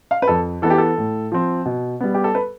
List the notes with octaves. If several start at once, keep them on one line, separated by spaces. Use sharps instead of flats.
F5
B4
F2 A4
E3 B3 A4
G4
A4
A2
F3 C4
B2
G3 B3
G4
A4
B4